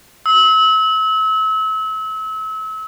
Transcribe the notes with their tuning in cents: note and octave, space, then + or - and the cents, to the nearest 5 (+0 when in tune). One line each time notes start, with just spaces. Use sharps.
E6 -35